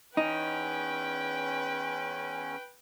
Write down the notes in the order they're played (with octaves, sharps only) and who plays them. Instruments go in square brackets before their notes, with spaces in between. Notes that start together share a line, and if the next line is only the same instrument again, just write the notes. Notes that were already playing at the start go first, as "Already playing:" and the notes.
[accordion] E2 C#4 [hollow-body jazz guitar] D#4 [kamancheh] B4 G5